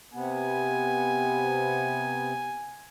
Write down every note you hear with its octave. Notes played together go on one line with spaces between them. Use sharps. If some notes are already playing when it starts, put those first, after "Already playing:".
C3 B3 G#5